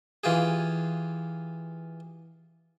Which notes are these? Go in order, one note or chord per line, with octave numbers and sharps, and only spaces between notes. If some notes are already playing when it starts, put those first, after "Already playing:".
E3 F4 G4 G#4